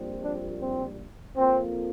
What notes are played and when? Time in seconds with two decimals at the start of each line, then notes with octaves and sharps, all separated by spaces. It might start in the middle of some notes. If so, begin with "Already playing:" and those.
Already playing: A#1 A#2 G3 C4
0.22 D4
0.60 C4
1.36 F2 F3 A#3 C4